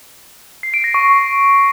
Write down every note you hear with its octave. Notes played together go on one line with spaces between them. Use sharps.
C7
D7
A#6
C#6